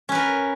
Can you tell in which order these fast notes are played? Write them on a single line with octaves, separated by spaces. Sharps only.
C#4 B4 A#4